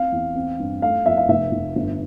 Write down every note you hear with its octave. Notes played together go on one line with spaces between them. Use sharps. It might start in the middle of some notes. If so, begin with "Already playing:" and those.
Already playing: C4 F5
E2
C4
G2
A3 F5
F2 E5
F5
F1 E5
F1
G1